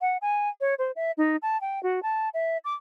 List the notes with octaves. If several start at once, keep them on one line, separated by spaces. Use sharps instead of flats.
F#5
G#5
C#5
C5
E5
D#4
A5
G5
F#4
A5
E5
D6